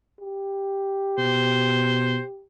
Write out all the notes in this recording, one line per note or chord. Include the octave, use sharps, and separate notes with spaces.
G4
B2 C5